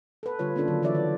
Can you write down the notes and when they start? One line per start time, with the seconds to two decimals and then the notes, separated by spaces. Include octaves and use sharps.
0.23 A4 B4
0.39 D3 G3 F4 C#5
0.56 A#3 C#4 D4 F4 A4
0.68 D3 D#3 F#3
0.83 E3 B4 C#5 D5 E5
0.95 D#3